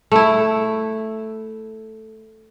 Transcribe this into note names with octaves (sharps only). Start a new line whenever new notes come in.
A3 E4